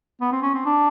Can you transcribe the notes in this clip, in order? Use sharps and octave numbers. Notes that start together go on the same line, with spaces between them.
B3
C4
C#4
C4
D4